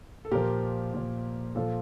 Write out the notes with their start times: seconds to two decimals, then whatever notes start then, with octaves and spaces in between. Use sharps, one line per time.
0.25 A4
0.31 A#2 F3 G4 A#4
0.94 A#2 F3
1.55 A#2 F3 F4 A4